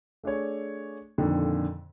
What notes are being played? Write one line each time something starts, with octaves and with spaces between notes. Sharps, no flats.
A3 D4 G#4 C#5
F2 A#2 D3 D#3